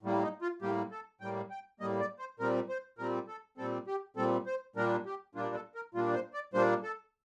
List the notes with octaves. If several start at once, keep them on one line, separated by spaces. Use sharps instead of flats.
A2 G3 A#3
D#4
F4
A2 G3 A#3 G4
A4
A2 G3 A#3 G5
G5
A2 G3 A#3 D#5
D5
C5
A#2 G3 C4 A#4
C5
A#2 G3 C4 A#4
A4
A#2 G3 C4 A4
G4
A#2 G3 C4 A4
C5
A#2 G3 A#3 D4 A#4
G4
A#2 G3 A#3 D4 F4
A4
A#4
A#2 G3 A#3 D4 F4
C5
D5
A#2 G3 A#3 D4 C5
A4